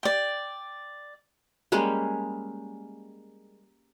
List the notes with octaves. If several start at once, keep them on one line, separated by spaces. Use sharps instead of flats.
D5 G5
G3 G#3 A#3 C#4